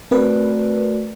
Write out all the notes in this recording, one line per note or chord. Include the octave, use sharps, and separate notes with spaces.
A3 C4 F#4 A#4 B4 D5